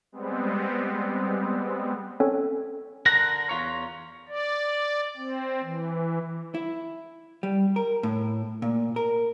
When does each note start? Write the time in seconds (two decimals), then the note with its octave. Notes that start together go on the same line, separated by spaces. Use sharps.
0.12 G3 G#3 B3 C4
2.20 C4 C#4 A4 C#5
3.06 D3 A#4 F#5 A#5
3.49 E2 F4 C#5
4.28 D5
5.17 C4
5.63 E3
6.54 E4
7.43 G3
7.76 A#4
8.03 A2
8.62 A#2
8.96 A#4